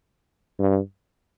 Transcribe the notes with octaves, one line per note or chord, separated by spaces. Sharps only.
G2